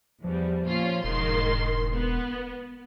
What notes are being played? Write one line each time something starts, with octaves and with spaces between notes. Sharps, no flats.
E2 F3 G3
A#2 C#4 F4
E1 G#2 D#3 C6
B3